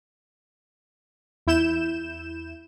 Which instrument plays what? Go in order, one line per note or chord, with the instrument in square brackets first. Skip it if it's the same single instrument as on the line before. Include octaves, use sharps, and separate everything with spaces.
[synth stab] E2 E4 G6 E7